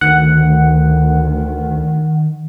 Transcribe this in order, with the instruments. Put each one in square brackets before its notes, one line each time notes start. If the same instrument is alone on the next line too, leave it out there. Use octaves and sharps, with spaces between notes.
[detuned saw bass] D2 [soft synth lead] D#3 [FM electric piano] F#5